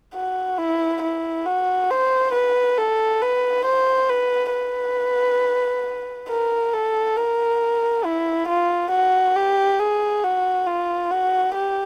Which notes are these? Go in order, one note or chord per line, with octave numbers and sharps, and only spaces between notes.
F#4
E4
E4
F#4
C5
B4
A4
B4
C5
B4
B4
A#4
A4
A#4
E4
F4
F#4
G4
G#4
F#4
F4
F#4
G4